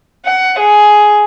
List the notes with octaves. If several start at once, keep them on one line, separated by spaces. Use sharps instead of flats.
F#5
G#4